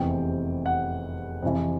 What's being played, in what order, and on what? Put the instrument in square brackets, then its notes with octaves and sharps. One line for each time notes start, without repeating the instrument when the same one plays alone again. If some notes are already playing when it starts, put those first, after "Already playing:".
Already playing: [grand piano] F1 E2 C3 E3 G5
F#5
F2 C3 E3